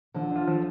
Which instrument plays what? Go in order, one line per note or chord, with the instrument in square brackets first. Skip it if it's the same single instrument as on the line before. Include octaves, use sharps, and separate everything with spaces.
[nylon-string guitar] D3 [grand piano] F3
[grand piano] D4 F4
F3